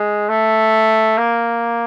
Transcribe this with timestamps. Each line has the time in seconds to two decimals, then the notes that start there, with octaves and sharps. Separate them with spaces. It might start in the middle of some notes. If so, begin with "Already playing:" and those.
Already playing: G#3
0.29 A3
1.18 A#3